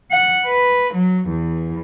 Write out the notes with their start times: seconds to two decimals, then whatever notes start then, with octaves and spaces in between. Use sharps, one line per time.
0.11 F#5
0.46 B4
0.94 F#3
1.29 E2